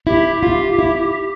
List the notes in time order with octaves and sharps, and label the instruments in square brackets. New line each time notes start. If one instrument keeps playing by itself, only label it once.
[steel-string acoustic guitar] E4 [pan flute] G4
[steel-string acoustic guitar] F4
E4